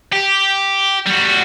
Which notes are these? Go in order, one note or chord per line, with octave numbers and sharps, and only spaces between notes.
G4
G3 F#4